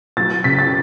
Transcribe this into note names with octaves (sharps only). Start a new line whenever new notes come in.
F#3 A6
C#3 B6
A6